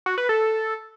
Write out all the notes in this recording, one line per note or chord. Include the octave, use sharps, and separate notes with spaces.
F#4
B4
A4